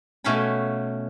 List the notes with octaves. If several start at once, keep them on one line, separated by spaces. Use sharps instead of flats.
B2 A3 C#4 F5 G#5 B5